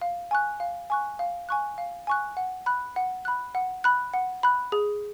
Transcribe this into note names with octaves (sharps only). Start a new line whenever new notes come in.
F5
G#5 C#6 F#6
F5
G#5 C#6 F#6
F5
G#5 C#6 F#6
F5
G#5 C#6 F#6
F#5
B5 F#6
F#5
B5 F#6
F#5
B5 F#6
F#5
B5 F#6
G#4